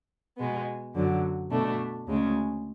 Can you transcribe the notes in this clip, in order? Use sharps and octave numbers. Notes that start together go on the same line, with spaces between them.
B2 G#3 B3
F#2 D3 F#3
B2 A3 D4
D2 C#3 G#3 C#4